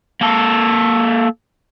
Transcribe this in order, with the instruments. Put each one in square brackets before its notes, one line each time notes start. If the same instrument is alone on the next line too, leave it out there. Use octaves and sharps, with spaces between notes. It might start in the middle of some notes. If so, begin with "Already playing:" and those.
[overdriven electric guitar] A#3 A4